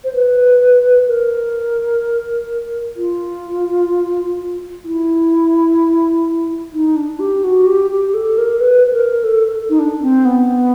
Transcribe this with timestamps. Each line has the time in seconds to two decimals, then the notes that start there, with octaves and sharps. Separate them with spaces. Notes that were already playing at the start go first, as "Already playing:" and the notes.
0.04 C5
0.14 B4
1.08 A#4
2.96 F4
4.84 E4
6.73 D#4
6.96 D4
7.19 G4
7.44 F#4
7.66 G4
7.91 G4
8.14 A4
8.38 A#4
8.60 B4
8.87 B4
8.93 A#4
9.24 A4
9.69 D#4
9.79 D4
10.02 C4
10.25 B3